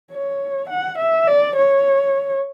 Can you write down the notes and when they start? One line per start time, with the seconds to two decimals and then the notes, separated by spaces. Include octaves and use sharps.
0.12 C#5
0.70 F#5
0.98 E5
1.28 D5
1.56 C#5